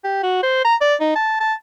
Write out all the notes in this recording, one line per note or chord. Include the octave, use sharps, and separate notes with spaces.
G4
F#4
C5
A#5
D5
D#4
A5
A5